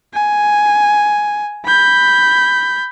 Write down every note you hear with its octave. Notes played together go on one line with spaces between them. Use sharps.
G#5
B5 G6